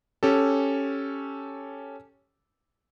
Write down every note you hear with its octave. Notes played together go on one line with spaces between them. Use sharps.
C#4 G4 A4